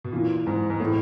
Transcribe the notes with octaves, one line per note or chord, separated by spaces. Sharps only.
B2
A#2 E3
G#2 E3
G#2
A2 E3